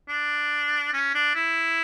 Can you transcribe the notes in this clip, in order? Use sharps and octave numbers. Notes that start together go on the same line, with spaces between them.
D4
C#4
D4
E4